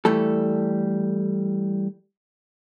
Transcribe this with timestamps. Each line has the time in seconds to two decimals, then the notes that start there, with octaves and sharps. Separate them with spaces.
0.05 E3 G3 A3 A4